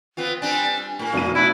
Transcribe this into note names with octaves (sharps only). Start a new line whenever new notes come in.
B3 C4 F4
G3 C4 D4 G#5
A2 A#3
F1 B2 F#4 D#7
D4 E4